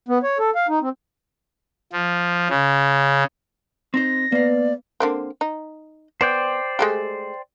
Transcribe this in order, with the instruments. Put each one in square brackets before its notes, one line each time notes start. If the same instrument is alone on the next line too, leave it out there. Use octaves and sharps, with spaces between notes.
[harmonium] B3
C#5
A4
F5
D#4
C4
[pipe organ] F3
C#3
[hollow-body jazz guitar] C4 D#4 C5 [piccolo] A#6
[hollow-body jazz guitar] A#3 F5 [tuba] B3 [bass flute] D5
[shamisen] D3 A#3 C4
D#4
[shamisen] B3 [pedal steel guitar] C5 D5 G5
[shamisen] G#3 A3 G4